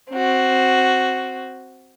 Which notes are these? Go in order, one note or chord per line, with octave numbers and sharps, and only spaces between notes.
C4 F#4